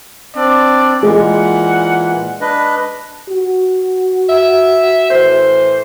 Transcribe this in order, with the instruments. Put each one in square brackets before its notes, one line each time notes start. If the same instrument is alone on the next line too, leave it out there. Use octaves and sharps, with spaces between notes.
[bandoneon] C4 D4 [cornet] D5
[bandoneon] A#2 E3 [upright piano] G#3 [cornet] F#5
[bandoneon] D4 B4 D#5
[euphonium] F#4
[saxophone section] E5
A2 E3 C5